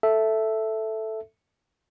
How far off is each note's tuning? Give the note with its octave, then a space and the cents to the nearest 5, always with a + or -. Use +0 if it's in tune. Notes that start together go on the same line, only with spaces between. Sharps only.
A4 +0 E5 +0